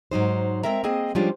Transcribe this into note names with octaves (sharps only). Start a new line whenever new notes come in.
G#2 F#3 D#4 C5
G#3 C4 A#4 E5 A#5
A#3 C4 G#4 D#5
F3 G3 G#3 C#4 D4 F4